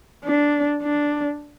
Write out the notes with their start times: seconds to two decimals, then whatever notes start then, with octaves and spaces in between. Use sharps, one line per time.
0.24 D4
0.83 D4